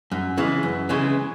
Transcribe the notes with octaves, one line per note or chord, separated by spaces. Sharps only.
F#2
C#3 E3 G#3
F#2
C#3 E3 G#3